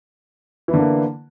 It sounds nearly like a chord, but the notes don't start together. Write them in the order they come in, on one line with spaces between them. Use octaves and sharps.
E3 E4 D3 B3 A#3